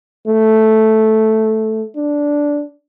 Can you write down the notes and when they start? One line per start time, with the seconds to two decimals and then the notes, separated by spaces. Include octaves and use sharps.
0.27 A3
1.96 D4